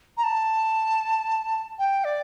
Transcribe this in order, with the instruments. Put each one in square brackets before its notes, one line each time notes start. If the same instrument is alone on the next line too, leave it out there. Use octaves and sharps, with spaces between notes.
[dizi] A#5
A5
G5
D5